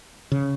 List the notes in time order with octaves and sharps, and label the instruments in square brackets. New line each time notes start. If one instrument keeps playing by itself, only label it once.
[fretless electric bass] C#3